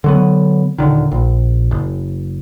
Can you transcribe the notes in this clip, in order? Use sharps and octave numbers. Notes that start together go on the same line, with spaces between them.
D3 F#3 B3
D#1 D2 D3 D#3
A#1
F#1